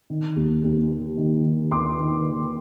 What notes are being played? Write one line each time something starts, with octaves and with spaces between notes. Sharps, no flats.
D#3
D#2
D#2
D#3
D#3
D#3
D#2 C6 D6
D#3
D#3